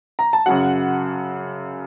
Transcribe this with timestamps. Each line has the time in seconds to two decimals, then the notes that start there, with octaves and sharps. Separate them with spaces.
0.19 A#5
0.33 A5
0.46 F#2 C#3 F#3 F#5